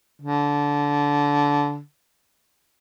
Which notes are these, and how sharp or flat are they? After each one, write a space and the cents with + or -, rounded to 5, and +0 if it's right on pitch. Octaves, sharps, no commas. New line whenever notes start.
D3 -20